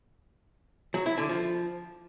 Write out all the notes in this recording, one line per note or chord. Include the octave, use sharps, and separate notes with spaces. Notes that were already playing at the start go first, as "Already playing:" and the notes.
F#3
E4
D3
F3